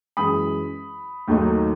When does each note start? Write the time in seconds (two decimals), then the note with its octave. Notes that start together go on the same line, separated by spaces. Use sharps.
0.17 F#2 E3 G#3 B5 D#6
1.28 D#2 D#3 F#3 A3 D#4